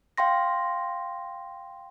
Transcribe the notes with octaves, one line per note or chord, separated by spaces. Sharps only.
F5 G5 C6 A#6